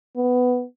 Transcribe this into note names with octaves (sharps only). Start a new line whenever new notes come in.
B3